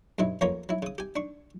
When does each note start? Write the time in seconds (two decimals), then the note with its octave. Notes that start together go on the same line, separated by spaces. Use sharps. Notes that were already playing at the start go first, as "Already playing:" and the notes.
0.19 G2 B2 F#3 E4
0.41 F2 A#3 B3 C#4 C#5 A#5
0.69 F#3 E4
0.82 C#3 D#6
0.98 G4 G#5
1.16 D4 C#6